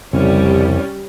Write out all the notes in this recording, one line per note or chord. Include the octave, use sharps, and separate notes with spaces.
C2 F2 C#3 G3 C4 C#4